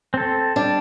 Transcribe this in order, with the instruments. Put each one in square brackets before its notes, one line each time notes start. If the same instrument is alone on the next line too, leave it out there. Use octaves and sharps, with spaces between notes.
[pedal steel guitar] C4 A4
[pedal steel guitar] G3 [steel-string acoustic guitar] D4